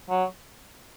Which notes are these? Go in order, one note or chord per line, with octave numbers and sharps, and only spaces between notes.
F#3